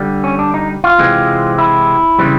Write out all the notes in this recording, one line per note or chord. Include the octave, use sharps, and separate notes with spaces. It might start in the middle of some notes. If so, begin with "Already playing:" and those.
Already playing: D3 G3
C#4
D4
D#4
F4
C3 E3 G#3 C4
E4
C#3 E3 G3 C4